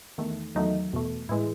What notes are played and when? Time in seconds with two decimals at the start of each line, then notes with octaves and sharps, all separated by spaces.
0.18 E2 D#3 A3
0.55 E2 D#3 F#3 A3 D#4
0.93 E2 B2 A3
1.29 A2 E3 G#3 E4